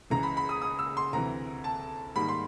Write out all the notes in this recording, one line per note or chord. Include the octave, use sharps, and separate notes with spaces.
C#2 C#3 E3 A#5
B5
B5
D#6
D#6
E6
C6
D2 C3 E3 A#5
A5
G#2 D#3 G3 A#3 B5
C6